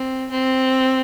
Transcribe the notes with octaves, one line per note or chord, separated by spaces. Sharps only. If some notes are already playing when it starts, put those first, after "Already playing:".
Already playing: C4
C4